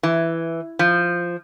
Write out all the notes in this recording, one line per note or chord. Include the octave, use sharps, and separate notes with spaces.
E3
F3